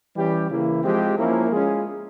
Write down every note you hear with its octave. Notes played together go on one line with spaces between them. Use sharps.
E3 G3 C#4 G4
C#3 E3 A#3 E4
F3 G#3 C4 G4
F3 A#3 C#4 E4 A#4
G#3 C#4 F4 G#4